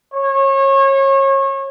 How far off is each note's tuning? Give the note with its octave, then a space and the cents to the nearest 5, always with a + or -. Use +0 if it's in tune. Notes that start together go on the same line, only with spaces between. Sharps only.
C#5 -30